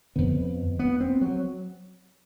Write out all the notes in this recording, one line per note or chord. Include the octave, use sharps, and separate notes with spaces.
F2 D3 B3
B3
C4
F#3